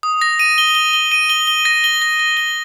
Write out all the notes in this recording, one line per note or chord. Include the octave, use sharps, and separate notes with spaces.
D#6
A#6
D#7
G7
G7
G7
D#7
G7
G7
A#6
G7
A#6
A#6
G7